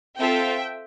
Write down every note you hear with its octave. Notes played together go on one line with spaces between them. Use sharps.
C4 F4 A4 E5 G5